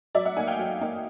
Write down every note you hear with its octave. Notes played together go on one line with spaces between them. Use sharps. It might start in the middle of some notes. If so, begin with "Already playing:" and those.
F#3 D5 E5
E5 F#5
A#3 D#4 F#5 G#5
F5 G5
F#3
A#3 D#4